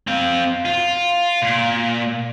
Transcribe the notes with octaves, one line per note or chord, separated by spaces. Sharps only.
C4 F5
F4
A#2